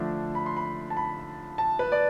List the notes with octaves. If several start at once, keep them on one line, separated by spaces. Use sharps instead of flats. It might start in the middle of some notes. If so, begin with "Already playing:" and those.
Already playing: D3 F3 A3 D4
B5
C6
B5
A5
B5
A5
B4
D5